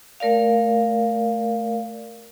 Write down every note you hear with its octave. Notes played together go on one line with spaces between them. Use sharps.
A3 A#4 D5 F5